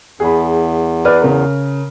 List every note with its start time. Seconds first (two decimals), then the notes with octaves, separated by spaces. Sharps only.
0.20 E2 G#4 B5
1.05 B4 D5 F6
1.21 C#3 A#4